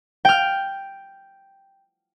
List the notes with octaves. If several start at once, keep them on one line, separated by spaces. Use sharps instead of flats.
G5 F6